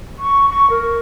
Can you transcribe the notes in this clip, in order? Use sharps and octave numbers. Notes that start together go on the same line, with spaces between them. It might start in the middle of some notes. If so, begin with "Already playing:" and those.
C#6
C#6
A#4